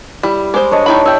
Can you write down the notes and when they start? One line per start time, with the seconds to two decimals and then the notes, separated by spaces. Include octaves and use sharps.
0.23 G3 E4
0.54 G#3 C5 D6 D#6
0.71 D4 C#5 D#5
0.86 D#3 E4 B5
1.05 E4 G5 E6